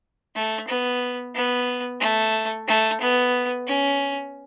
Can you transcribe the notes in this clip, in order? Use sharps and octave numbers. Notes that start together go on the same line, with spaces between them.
A3
B3
B3
A3
A3
B3
C#4